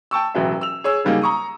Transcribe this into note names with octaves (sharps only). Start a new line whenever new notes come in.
G5 A5 C#6 E6
E1 A1 F#3 E5
E6 F7
G#4 C#5 E6
C#3 F#3 G3 A#3 D#4 G#4
A#5 C#6 D#6